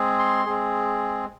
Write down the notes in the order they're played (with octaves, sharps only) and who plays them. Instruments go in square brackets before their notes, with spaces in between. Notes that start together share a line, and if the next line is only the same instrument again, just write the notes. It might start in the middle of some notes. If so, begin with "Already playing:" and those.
Already playing: [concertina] G#3 C4 G#4
C6
G#3 C4 G#4